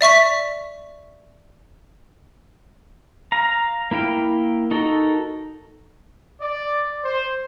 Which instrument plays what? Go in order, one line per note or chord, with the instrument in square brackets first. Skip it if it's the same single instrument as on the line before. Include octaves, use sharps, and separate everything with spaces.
[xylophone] D5 E5 C#6 B6
[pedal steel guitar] F5 A#5
A#3 E4 F5 G5
D#4 F#4 A4 A#4
[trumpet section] D5
C5